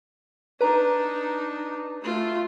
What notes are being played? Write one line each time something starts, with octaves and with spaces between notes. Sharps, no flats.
D4 D#4 B4 A#5
A3 F4